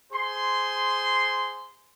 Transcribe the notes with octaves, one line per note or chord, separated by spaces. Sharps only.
G#4 C5 C6